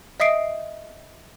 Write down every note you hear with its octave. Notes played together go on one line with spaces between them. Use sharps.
D#5 E5 D#6 C7 D7